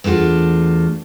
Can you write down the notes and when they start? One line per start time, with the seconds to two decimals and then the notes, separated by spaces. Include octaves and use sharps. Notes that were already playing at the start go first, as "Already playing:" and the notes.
0.04 E2 A3 D4 F4 F#4